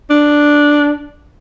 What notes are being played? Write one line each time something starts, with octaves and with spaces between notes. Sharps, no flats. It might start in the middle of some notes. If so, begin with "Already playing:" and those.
D4